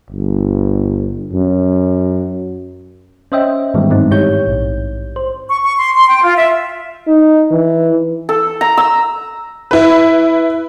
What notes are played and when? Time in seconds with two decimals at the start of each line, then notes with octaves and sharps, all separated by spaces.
0.10 G1
1.32 F#2
3.32 C#4 C5 D#5 E5 G5
3.74 G#2 D#3 E3 G3 G#3 B3
3.89 G2 E3 F#3 G#3 C4 D#4
4.11 G#2 D#4 E4 G4 C#5 G6
4.48 A#1
5.16 C5
5.49 C#6
5.62 C#6
5.77 C6
5.93 C6
6.08 G5
6.23 F4
6.36 E5
7.07 D#4
7.51 E3
8.29 A4
8.61 A#5
8.77 E6
9.71 E4 B4